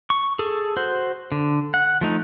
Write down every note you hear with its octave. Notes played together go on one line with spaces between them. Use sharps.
C#6
G#4 A4
F#4 C5
D3
F#5
F3 A3 D#4